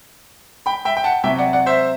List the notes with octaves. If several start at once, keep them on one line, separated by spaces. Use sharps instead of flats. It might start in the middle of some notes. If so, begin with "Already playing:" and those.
G5 B5
E5 G5
G5
F#5 A5
C3 F#3 E5 G5
D5 F#5
D5 F#5
C5 E5